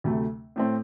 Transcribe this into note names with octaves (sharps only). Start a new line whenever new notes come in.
D2 C3 F#3 A3
A2 A3 C4